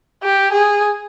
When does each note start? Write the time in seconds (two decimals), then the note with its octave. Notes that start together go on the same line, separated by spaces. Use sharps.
0.23 G4
0.53 G#4